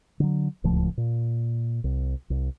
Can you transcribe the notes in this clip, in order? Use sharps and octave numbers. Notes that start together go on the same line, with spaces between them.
D3 F#3
D1 C#2 A2 F3
A#2
C2
C2